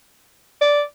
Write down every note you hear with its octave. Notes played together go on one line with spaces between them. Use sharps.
D5